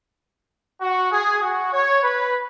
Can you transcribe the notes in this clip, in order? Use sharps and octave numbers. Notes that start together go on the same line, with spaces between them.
F#4
G#4
F#4
C#5
B4